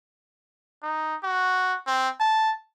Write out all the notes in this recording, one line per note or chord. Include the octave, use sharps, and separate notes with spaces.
D#4
F#4
C4
A5